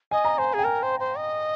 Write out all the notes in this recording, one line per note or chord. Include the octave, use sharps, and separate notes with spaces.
D#5 G#5
A#5
C5 G#5
G#4 G5
A#4 G#5
C5
C5
D#5